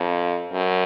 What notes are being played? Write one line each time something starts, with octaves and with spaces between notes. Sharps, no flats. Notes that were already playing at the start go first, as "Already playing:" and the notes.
Already playing: F2
F#2